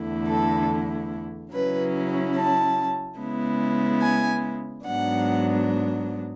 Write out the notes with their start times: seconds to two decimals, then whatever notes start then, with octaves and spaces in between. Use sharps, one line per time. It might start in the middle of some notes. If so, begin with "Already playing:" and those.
Already playing: E2 D3 A3 E4
0.27 A4
1.52 C#3 F#3 C#4 E4 B4
2.36 A5
3.19 C#3 G#3 B3 E4
4.01 G#5
4.85 G#2 F#3 B3 D4 F#5